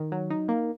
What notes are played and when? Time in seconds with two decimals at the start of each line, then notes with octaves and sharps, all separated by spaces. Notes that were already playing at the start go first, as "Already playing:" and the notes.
Already playing: D#3
0.12 F#3
0.30 D#4
0.48 A#3